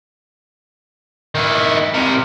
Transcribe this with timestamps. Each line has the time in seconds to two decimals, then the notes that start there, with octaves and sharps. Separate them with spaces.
1.35 D#3 E4
1.94 C3 A#4